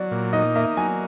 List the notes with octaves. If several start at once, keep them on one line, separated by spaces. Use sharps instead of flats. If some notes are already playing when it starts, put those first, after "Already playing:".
Already playing: F#3 D5
A#2
D#4 D#5
A#3 E5
F#3 G#5